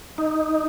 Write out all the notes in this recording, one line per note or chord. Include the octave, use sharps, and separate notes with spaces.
D#4